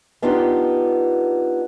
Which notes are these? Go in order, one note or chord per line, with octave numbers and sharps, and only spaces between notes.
B3 D4 D#4 F4 G4